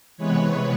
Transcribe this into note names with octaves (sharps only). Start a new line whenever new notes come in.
C3 E3 G#3 B3 B4 C#5